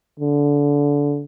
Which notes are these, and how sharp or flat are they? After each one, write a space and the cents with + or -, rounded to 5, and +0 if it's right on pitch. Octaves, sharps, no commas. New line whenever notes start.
D3 -20